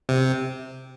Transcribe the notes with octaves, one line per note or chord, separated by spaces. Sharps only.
C3